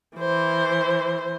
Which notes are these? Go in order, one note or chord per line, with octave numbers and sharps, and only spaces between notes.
E3 C5